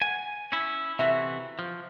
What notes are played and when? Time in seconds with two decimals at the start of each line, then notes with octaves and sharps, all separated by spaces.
0.02 F#5 G#5
0.52 C#4 E4
0.99 C3 E3 F#4 E5
1.59 F3